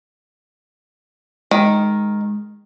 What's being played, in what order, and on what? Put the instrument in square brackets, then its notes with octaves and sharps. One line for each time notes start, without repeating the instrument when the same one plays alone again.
[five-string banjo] D#3 [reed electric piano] G#3